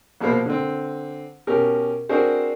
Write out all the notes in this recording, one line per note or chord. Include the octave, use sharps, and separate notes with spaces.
A#1 B2 A#3 A#4 C5 B5
D3 C4
B2 C#4 G4 A#4
C4 D4 F#4 G#4 A#4 C5